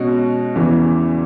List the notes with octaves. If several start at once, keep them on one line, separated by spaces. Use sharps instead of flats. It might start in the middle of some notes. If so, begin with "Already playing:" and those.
Already playing: B2 G#3 C#4 F#4
E2 C#3 E3